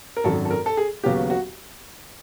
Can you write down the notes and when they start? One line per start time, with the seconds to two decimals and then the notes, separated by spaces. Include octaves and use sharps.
0.17 A#4
0.24 G#1 F#2 D#3 A4
0.45 A4
0.50 A#4
0.66 A4
0.77 G#4
1.04 D#2 C#3 F#3 B3 G4
1.30 F#4